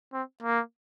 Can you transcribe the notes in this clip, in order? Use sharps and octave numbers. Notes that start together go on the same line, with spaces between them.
C4
A#3